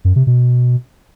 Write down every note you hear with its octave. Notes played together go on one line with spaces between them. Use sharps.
F#2
C3
B2